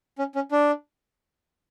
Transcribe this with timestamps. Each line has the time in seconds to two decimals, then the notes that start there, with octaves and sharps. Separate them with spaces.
0.19 C#4
0.35 C#4
0.51 D4